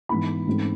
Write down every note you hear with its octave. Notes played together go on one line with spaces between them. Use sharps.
G#2 E3 B3 E4 B5
G#2 E3 A3 C4